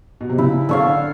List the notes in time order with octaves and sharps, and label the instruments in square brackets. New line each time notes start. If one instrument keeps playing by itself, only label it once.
[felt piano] B2
C3
[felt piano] C#3 [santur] E4
[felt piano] D3 [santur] A4 C#5 F5